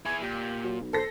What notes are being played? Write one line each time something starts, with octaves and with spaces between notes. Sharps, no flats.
E4 G#4 G#6
A#2 G4
F#3
B1
A4 C5 A#6